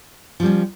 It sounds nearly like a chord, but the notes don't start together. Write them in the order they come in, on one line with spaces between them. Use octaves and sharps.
F3 G3 C#4